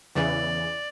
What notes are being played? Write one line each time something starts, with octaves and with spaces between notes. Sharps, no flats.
E2 C#3 E3 D5